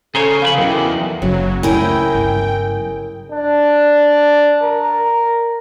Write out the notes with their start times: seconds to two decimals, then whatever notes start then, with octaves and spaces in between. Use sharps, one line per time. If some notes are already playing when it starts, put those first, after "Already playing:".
0.15 C#3 G#4 A4 C5 C#5 A#5
0.42 F2 G4 F5 B5
0.58 E2 F#3 B3 D#4 A#4 G5
1.22 F#1 C#3 F#3
1.63 D2 E4 G#4 A#4 G5
2.14 G1 F#3
3.32 D4
4.63 A#4